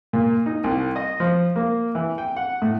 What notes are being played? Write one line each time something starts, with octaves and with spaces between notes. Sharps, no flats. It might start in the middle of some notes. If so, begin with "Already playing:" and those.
A#2
D#4
C2
D#5
F3
A#3
E3
G5
F#5
A2